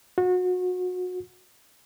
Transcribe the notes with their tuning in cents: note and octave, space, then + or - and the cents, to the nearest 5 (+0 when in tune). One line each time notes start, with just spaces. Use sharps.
F#4 -30